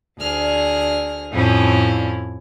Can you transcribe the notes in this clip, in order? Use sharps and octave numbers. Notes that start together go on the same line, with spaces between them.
D2 G#4 F6
F2 A2 C#4 E4